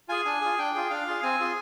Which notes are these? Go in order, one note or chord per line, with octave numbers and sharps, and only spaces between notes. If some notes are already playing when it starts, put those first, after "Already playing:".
F4 G#4 G#5
D4 G#5
F4 G#4
D4 G5
F4 G#4
D4 F5
F4 G#4
C4 G#5
F4 G#4